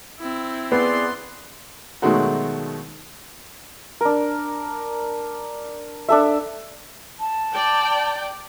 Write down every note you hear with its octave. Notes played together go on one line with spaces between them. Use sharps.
C4 E4
B3 G#4 D5 C6
B2 D#3 F#3 G#3 A3 F#4
D4 A#4
D4 A4 E5
A5
D5 G5